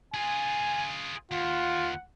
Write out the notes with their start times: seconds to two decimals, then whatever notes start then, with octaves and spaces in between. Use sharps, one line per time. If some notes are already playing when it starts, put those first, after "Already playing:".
0.14 F4 G#4 G#5
1.31 D#2 F4 F#5